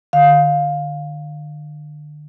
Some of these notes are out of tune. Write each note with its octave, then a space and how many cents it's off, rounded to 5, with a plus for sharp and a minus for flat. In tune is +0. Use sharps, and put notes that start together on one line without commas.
D3 +35 F5 +10